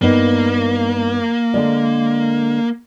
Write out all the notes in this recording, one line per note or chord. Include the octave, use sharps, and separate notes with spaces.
G2 A#3 B3 D#4
D3 G#3 D5